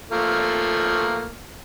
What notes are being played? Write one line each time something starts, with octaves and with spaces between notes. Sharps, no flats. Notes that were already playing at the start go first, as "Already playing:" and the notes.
F3 A3 A#3